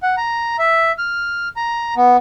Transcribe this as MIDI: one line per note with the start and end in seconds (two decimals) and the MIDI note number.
0.03 0.16 78
0.17 0.56 82
0.59 0.92 76
0.98 1.48 89
1.56 1.94 82
1.97 2.17 59